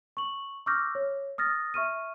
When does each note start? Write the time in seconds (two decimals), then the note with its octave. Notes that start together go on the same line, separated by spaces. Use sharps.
0.17 C#6 F#7
0.66 C#6 D6 E6 F6 G6 A#6
0.95 C#5
1.38 D#6 F6 A6 A#6
1.74 E5 C#6 F6 D#7